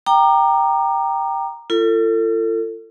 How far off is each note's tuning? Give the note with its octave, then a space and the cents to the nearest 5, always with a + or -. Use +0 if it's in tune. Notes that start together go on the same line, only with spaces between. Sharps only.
G5 +0 A#5 +0 D6 +35
F4 -45 A4 +30